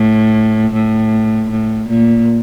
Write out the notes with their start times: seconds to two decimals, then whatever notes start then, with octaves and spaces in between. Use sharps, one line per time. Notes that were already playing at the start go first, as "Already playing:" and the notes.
Already playing: A2
0.73 A2
1.49 A2
1.89 A#2